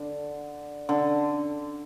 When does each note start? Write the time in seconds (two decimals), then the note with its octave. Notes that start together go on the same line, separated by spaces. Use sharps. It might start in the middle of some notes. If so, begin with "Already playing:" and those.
Already playing: D3
0.89 D3